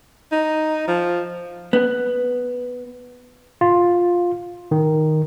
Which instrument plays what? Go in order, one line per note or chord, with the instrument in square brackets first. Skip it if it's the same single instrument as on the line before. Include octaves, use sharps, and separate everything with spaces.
[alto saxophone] D#4
F3
[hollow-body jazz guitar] B3
[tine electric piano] F4
D#3